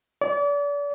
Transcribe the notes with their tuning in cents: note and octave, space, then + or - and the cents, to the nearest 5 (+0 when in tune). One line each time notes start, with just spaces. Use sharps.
D5 -35